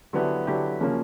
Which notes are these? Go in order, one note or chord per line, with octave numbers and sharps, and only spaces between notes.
D3 F#3 B3 E4 G4
D3 F#3 B3 E4 G4
C#3 F3 A#3 C#4